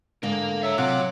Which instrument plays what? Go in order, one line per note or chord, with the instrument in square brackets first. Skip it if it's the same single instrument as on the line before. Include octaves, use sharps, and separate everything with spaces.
[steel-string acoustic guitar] G#2 D3 [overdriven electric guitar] A#4 F5
[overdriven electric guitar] C#5 A#5 [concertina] E5
[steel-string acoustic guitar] C3 [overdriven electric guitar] F#3 C#5 [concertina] F4 F#5 D6